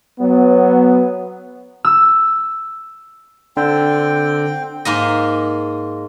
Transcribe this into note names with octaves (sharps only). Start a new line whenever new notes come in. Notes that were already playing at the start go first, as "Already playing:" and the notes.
F#3 B3
E6
D3 C4 G5
G#2 A#3 D#5